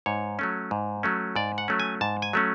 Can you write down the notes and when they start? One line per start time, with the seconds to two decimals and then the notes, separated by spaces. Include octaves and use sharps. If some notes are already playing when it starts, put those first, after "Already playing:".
0.06 G#2 C#5
0.39 F#3 A3 C#4
0.71 G#2
1.03 F#3 A3 C#4
1.36 G#2 D5
1.58 F#5
1.68 F#3 A3 C#4
1.80 G#5
2.01 G#2 A5
2.22 G#5
2.33 F#3 A3 C#4